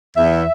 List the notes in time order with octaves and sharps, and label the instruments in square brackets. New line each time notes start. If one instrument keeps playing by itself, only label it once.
[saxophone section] E2 E5